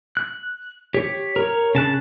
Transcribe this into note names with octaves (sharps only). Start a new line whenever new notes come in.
F#6
G4 C#5
A#4 C#5
C#3 A5 F#6